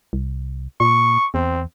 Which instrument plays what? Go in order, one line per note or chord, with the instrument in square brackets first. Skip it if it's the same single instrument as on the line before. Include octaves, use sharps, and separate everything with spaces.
[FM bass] C2
[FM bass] A#2 [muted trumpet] C#6
[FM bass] E2 [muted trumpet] C4